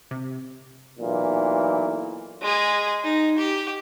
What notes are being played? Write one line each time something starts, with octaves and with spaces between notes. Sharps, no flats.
C3
B1 A#2 E3
G#3 G#4
D#4
G4